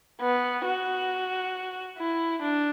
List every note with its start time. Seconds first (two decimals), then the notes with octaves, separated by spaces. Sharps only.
0.21 B3
0.65 F#4
1.98 E4
2.42 D4